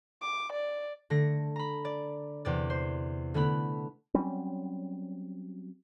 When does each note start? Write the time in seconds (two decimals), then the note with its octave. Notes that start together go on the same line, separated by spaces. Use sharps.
0.22 D6
0.52 D5
1.10 D3 A3 A#6 C#7
1.56 A#5 B5
1.85 D5
2.45 E2 C3 D5
2.70 C5
3.34 D3 A3 B3 E4 B5
4.14 F#3 G3 C4 C#4